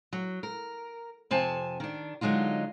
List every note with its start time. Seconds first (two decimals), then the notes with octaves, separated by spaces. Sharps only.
0.13 F#3
0.43 A#4
1.31 F2 C3 C4 G#5 A5
1.80 D#3 D4
2.21 D3 F#3 G#3 D#4 F4